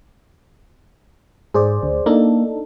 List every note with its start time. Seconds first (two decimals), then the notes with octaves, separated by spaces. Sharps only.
1.54 G#2 G#4 C5 D5
1.83 D2
2.06 A#3 D4 D#4 A4